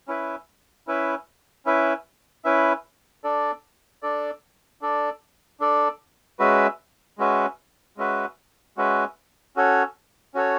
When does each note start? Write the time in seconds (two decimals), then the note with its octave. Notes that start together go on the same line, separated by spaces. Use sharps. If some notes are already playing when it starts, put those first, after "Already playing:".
0.08 C#4 E4 B4 E5
0.87 C#4 E4 B4 E5
1.66 C#4 E4 B4 E5
2.44 C#4 E4 B4 E5
3.24 D4 A4 D5
4.03 D4 A4 D5
4.81 D4 A4 D5
5.60 D4 A4 D5
6.39 G#3 C#4 F#4 B4 E5
7.18 G#3 C#4 F#4 B4 E5
7.97 G#3 C#4 F#4 B4 E5
8.77 G#3 C#4 F#4 B4 E5
9.56 C#4 F#4 A4 C#5
10.34 C#4 F#4 A4 C#5